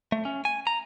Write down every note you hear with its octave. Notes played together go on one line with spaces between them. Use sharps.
A3
C#4
G#5
A#5